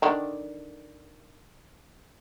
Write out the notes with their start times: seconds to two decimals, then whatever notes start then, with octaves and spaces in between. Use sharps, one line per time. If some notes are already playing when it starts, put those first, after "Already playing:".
0.02 D3 D#3 D4